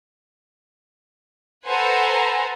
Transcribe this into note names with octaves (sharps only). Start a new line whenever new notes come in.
A4 B4 C5 F#5 G#5 A#5